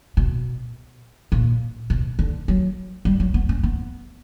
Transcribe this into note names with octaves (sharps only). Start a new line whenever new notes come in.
B2
A#2
B2
D3
F#3
G3
F#3
B3
C#4
B3